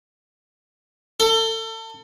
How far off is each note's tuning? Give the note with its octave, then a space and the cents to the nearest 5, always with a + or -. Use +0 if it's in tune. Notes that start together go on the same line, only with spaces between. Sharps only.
A4 +30